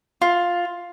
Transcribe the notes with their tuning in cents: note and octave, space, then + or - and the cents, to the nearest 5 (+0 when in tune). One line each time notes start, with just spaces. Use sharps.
F4 +5